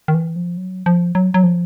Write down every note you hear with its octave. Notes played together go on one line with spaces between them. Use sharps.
D#3
E3
F3
F#3
F3
F#3
F#3
F3